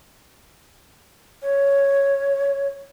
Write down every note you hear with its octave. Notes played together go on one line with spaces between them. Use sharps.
C#5